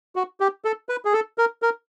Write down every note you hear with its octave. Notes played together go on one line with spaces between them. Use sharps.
F#4
G4
A4
B4
G#4
A4
A#4
A#4